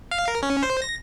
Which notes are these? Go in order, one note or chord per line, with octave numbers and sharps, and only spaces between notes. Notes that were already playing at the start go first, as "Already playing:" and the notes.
F5
A#4
C#4
C5
A#6